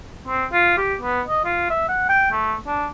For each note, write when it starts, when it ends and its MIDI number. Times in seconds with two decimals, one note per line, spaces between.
0.28 0.46 60
0.53 0.76 65
0.77 0.95 67
1.02 1.22 59
1.27 1.43 75
1.45 1.65 65
1.70 1.87 76
1.89 2.05 78
2.09 2.27 79
2.32 2.55 57
2.67 2.88 62